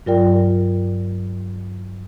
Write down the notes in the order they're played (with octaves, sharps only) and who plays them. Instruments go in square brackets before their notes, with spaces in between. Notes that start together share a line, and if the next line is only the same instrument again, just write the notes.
[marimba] G2 F#3 F4 A#4 D5 G5